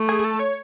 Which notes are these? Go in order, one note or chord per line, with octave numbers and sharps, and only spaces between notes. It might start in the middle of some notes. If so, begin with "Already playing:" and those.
Already playing: A3
G#4
G#4
A4
C#5